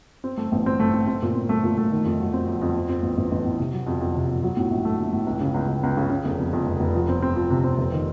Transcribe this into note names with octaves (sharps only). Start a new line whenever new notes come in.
C4
A3
A1
C4
A3
C4
C4
A#2
C4
A3
A#2
A3
D#3
F2
F#3
C4
F2
F2
C4
C4
A1
A1
A1
A2
C3
F#3
F2
F2
C3
F2
F#3
A2
A#1
A3
A#1
A2
C#2
C#3
C#2
C#2
C#2
C#3
C#3
F1
F2
F2
F1
F1
F3
C4
C4
F3
C3
C4
F1
D#3